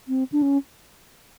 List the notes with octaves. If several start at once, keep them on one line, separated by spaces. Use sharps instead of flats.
C4
D4
C#4